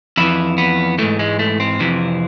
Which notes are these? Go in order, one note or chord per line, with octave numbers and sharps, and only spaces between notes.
F2 E3 E4
B3
G#2 E3 A3
G#3
A3
C4
F2 C3 E3